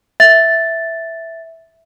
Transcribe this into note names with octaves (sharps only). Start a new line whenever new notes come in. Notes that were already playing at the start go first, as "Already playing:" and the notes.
E5 A6